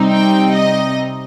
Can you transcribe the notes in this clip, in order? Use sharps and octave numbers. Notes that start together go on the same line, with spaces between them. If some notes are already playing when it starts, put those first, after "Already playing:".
Already playing: C3 G3 C4 D#4
G5
D#5